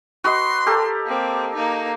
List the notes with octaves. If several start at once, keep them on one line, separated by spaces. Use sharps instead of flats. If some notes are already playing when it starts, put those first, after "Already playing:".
F#4 B4 D#5 C6
G4 A4 A#4
A#3 C4
A#3 D#4